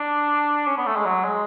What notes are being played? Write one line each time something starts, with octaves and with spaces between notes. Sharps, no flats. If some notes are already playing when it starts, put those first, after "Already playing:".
Already playing: D4
C#4
B3
A3
G#3
F#3
G#3